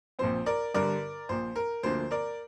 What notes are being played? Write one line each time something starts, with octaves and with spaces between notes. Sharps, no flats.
A#1 A#2 F3 C4 C5
A#4 D5
G1 G2 D3 G3 A#4 D5
A#1 A#2 F3 C5
A#4
D2 D3 F3 A#3 D4 C5
A#4 D5